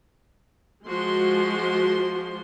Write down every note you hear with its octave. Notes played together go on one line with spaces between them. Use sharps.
F3 G#3 F#4 C6